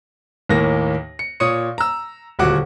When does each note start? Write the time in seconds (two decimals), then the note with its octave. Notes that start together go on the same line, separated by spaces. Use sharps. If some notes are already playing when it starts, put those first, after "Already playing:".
0.49 D#2 A2 A#3 A#6
1.19 C#7
1.40 A#2 C#5 C#6 D#6 C#7
1.78 A#5 E6
2.39 D#1 D2 F#4 F#5 D6